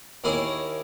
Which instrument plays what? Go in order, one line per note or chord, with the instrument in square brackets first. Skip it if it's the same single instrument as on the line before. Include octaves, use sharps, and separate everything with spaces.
[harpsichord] D#2 A#3 E4 G#4 C#5 D#6